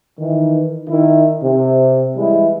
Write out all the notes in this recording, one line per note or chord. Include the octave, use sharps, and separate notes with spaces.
D#3 E3
D#3 E4
C3
E3 G3 G#3 E4